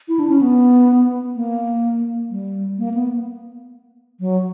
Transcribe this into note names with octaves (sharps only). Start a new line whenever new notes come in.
E4
D4
C#4
B3
A#3
G3
A#3
B3
F#3